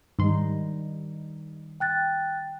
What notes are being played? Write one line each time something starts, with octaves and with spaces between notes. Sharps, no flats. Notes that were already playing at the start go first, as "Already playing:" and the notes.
G#2 D#3 G3 D#4 C6
G5 F#6 A6